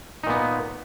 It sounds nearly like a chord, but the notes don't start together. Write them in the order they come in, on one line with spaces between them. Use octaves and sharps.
D#4 A#2 B3